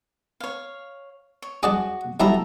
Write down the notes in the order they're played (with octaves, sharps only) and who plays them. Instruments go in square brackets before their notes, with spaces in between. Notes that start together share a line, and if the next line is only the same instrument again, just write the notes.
[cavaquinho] C#5 F5
C#5
[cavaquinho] F#4 [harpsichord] G#4 D5 A5
[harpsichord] F#3 E4 G4 [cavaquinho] A4 E5 A#5